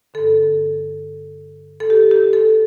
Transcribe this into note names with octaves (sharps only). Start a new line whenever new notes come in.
G2 D3 A4
A4
G4
G4
A4